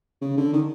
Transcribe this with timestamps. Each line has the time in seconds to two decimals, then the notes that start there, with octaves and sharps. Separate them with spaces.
0.21 C#3
0.37 D3
0.53 D#3